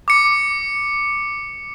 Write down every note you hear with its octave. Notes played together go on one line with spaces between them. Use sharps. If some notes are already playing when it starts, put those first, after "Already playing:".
D6 C#7